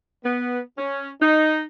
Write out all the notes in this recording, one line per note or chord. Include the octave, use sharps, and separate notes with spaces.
B3
C#4
D#4